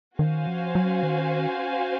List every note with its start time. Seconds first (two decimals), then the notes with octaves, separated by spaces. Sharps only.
0.19 D#3 C#4 F#4 C5 F5 G#5
0.47 F3
0.75 F#3
1.03 D#3